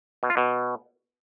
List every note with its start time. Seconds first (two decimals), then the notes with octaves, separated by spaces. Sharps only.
0.23 B2
0.30 F4
0.37 B2